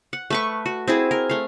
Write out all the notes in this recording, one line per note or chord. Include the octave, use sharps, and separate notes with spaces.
F#5
A3 B4 C#6
F#4
C4 E4 G#4
A#4
A3 F5